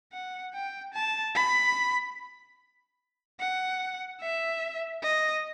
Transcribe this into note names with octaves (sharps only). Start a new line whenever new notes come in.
F#5
G5
A5
B5
F#5
E5
D#5